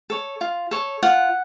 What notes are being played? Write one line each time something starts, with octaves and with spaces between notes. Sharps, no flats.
A4 C#5
F4
A4 C#5
F4 F#5